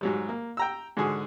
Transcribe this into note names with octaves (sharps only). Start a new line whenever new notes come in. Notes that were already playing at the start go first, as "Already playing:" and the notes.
G#2 F#3 G3
A#3
G5 A#5 E6
G#2 D3 F#4 G#4